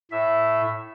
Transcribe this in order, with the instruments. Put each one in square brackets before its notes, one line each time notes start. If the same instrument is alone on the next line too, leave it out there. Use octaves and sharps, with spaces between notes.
[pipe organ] A2 E5